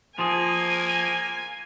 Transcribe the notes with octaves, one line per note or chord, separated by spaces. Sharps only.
F3 A#3 G#4 G#5